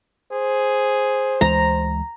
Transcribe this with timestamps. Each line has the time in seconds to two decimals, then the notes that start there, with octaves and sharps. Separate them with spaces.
0.32 G#4 C5
1.41 D2 E3 G#3 A#5